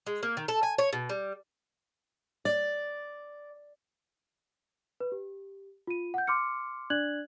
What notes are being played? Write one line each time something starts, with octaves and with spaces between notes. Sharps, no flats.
G#3
A#3
D#3
A4
G#5
C#5
B2
G3
D5
B4
G4
F4 D#7
F#5 G6
C6 D6 F6 C#7
D4 D5 F#6 G#6 F#7